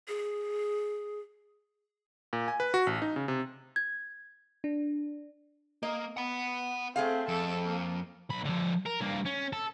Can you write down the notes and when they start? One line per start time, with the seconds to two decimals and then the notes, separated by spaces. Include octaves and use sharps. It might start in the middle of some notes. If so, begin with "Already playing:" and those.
0.08 G#4
2.33 A#2
2.48 G#5
2.60 B4
2.74 F#4
2.87 A1
3.02 D#4
3.16 C#3
3.28 C3
3.76 G#6
4.64 D4
5.83 A#3 D#5
6.17 B3 F#5 B5
6.96 A3 C4 G#4 F5
7.28 F2 A4
7.65 A#3
8.30 B1 B5
8.45 D3 F3
8.86 A#4
9.01 G2 A#3
9.26 C#4
9.53 A4